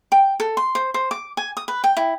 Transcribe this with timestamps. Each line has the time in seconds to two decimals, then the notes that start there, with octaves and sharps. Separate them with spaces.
0.12 G5
0.40 A4
0.57 C6
0.75 C5
0.94 C5
1.11 D6
1.37 G#5
1.57 D#6
1.68 B4
1.84 G5
1.97 E4